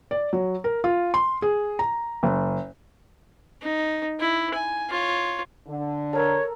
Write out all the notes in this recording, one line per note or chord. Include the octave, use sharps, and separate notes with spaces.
D5
F#3
A#4
F4
C6
G#4
A#5
F#1
D#4
E4
G#5
F4 C#5
D3
A4 A#4 C#5 A#5